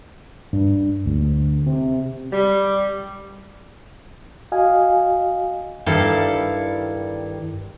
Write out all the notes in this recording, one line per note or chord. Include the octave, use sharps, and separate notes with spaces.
G2
D2
C3
G3
F#4 D#5 F5 G#5
G2 D#3 E4 A4 D5 F5